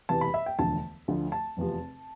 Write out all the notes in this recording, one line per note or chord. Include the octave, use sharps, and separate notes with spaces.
E1 E2 C3 E3 A5
B5
E5
G5
E1 D2 D3 F3 A5
D2 D3 F3
A5
F1 E2 C3 F3